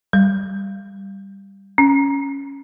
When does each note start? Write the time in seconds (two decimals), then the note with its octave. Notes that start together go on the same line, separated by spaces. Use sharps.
0.13 G3
1.78 C#4